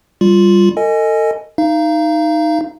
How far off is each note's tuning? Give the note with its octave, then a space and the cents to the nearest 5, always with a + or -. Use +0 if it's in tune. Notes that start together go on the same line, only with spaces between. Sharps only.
G3 +0 F4 +0
A4 +40 D#5 +0 G#5 +0
D#4 +0 F5 -30